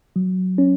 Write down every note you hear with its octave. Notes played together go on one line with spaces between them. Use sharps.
F#3
C#4